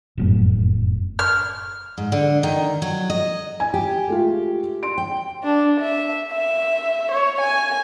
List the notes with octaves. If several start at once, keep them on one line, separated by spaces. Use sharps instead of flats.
F1 F#2 A2
F6
G#2
D3
D#3
F#3
D#5
G#5
G4
G#3 A3 F4
C6 D7
G5
D4
E5
E5
C#5
G#5